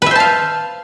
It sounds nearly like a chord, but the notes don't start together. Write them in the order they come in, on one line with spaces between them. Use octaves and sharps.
B4 E5 C5 A5 F5